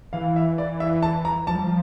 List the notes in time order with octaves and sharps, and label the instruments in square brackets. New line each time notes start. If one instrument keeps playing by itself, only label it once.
[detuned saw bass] E3 [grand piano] F5
[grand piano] E5
D5
E5
A5
A#5
[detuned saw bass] F3 [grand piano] A5
[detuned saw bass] G3
F3